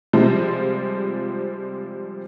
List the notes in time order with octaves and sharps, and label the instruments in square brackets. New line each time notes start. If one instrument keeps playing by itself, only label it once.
[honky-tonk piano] C3 F3 G3 G#3 C4